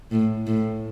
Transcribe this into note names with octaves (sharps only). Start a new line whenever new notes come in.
A2
A2